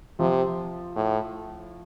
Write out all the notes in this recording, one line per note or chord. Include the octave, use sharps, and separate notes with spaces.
C3 F3
A2